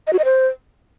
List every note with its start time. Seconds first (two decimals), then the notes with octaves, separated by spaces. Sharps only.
0.07 D#5
0.13 F#4
0.19 D#5
0.25 C5